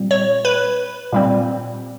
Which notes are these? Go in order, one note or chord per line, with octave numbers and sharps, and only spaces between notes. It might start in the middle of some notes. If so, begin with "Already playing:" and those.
Already playing: A#2 G3 C4
C#5
B4
A#2 G3 C4